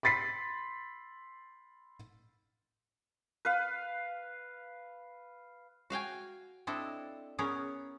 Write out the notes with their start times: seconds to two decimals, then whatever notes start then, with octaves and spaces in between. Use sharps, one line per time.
0.03 B5 C6 A6 B6 C7
3.45 B4 F5
5.90 F#4 F5 G5 G#5
6.67 C4 D4 E4 A4 D#5
7.38 B3 C#4 G#4 A#4 C#5